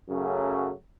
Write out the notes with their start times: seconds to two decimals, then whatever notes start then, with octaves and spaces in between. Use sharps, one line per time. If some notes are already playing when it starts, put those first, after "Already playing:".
0.09 F#2 C#3 F#3 A3